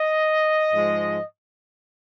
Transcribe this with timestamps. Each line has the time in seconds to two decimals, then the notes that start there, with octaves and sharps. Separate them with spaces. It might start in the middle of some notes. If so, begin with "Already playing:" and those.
Already playing: D#5
0.72 G#2 F3 G#3